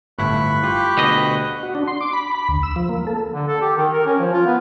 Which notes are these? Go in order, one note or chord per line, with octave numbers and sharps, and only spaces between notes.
G1 A2 E4 B5 C#6 F#6
F4 G4
D2 B2 D#5
F#4
D4
C6
D6
B5
B5
D2
E6
F3
A#3
A4
D3
A4
G4
D#3
A#4
C#4
F3
F4
B3